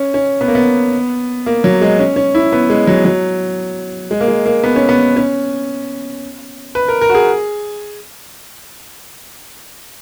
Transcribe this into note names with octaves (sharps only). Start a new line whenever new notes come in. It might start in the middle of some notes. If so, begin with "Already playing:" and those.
Already playing: C#4
C#4
B3
A#3
B3
A#3
F#3
G#3
C#4
C#4
E4
B3
G#3
F#3
F#3
G#3
A#3
G#3
A#3
B3
C#4
B3
C#4
B4
A#4
A#4
F#4
G#4